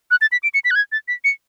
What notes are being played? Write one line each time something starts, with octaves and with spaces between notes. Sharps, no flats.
F#6
A6
B6
D7
C#7
B6
F#6
G#6
A6
B6
C#7